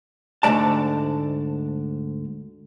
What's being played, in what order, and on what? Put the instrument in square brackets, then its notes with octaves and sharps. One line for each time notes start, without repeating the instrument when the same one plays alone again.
[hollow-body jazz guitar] D2 G#2 D3 A3 D5 A5